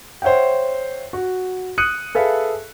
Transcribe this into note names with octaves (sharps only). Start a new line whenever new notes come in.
C5 C#5 E5 F#5 G5
F#4
D#6 F#6 C#7 D#7
G#4 A4 B4 E5 F5